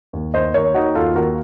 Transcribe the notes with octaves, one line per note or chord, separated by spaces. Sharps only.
D#2
D#2 C5 D#5
D#2 A#4 C#5
D#3 D#4 F#4
D#2 F4 A4
D#2 F#4 A#4